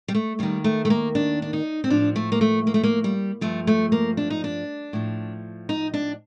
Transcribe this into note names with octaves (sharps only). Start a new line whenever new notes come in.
G3
A3
D#2 D#3 G3
A3
A3
A#3
D4
D4
D#4
C4
A2 F3 D4
A3
A#3
A3
A#3
A3
A#3
G3
G2 F3 A3
A3
A#3
D4
D#4
D4
A2 F3
D#4
D4